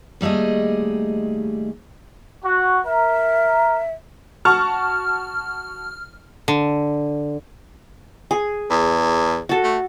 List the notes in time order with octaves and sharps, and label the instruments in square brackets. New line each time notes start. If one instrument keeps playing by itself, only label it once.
[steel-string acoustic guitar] D#2 G3 A3 G#4 D#5
[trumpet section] F#4
[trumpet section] A#4 [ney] E5
[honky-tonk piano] F#4 A5 C#6 [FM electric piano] F6
[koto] D3
[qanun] G#4
[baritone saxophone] E2
[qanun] F#4 A4
[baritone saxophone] A3